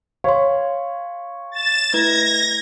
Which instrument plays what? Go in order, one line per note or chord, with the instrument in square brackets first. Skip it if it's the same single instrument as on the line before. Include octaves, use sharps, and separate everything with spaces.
[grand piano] C#5 [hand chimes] F5 C6
[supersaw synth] A6 E7
[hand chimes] A3 E4 B4 [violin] G#6 [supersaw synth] A#6